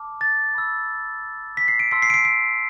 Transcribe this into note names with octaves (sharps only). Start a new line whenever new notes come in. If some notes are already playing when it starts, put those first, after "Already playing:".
Already playing: A5 D6 F6
A6
B5 E6
B6
C7
D7
A5 C6 E6 B6
C7
D7
C7
D7